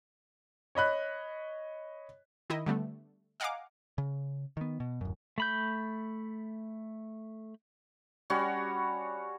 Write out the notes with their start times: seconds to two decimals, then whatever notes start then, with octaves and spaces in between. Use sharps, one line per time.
0.75 C#5 D#5 B5 F#6
2.50 D#3 E4 D#5
2.66 D3 G3 A3 B3
3.40 D#5 F5 F#5 G#5 A#5 D6
3.98 C#3
4.57 D#3 B3
4.80 B2
5.01 D1 F#2
5.38 A3 B5 G6
8.30 G3 C#4 F#4 C#5